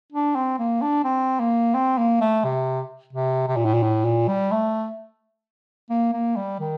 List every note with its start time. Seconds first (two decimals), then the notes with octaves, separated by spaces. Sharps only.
0.12 D4
0.35 C4
0.59 A#3
0.81 D4
1.04 C4
1.39 A#3
1.74 C4
1.98 A#3
2.21 A3
2.44 C3
3.13 C3
3.48 C3
3.56 A#2
3.65 A2
3.74 A#2
3.83 A2
4.05 A#2
4.28 G3
4.52 A3
5.90 A#3
6.13 A#3
6.36 G3
6.60 D#3